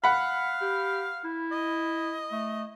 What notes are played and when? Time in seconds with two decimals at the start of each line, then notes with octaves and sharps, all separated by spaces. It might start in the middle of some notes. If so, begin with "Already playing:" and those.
0.04 F5 F#5 B5
0.61 G4
1.24 E4
1.52 D#5
2.32 A3